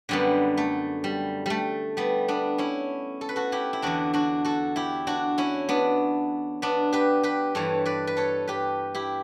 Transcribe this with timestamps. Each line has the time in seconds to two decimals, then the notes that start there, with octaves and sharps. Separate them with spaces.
0.09 F#2 D3 G3 B3
0.57 A3
1.04 G3
1.46 G3 A3
1.97 G3 B3
2.28 B3 D4
2.58 C#4 E4
3.21 A4
3.29 B4
3.36 F#4 A4
3.52 E4 G4
3.73 E4
3.82 E2 D3 D4 F#4
4.14 D4 F#4
4.45 F#4 A4
4.76 E4 G4
5.07 D4 F#4
5.38 C#4 E4
5.69 B3 D4
6.62 B3 D4
6.93 G4 B4
7.23 G4 B4
7.55 G2 E3 A4 C#5
7.85 B4 D5
8.07 B4
8.17 A4 C#5
8.47 G4 B4
8.94 E4 G4